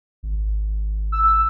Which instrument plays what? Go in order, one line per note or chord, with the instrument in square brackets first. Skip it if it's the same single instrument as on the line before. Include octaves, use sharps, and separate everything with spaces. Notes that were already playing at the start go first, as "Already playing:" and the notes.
[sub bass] G#1
[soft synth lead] E6